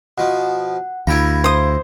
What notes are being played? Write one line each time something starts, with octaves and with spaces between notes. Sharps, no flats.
B2 F3 F#5
D2 E4 F5 G5 A#5 B5 G#6
C5 D#6